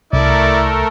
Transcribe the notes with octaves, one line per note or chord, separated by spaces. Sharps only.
C2 A3 E4 A4 A#4 D5